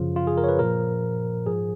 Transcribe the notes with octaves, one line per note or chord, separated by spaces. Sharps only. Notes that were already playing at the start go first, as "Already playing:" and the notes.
Already playing: F#2 C#3 F3 F4
F4
G#4
A#4
C#5
B4
A#2 F3 A#4
G#2 F3 G#4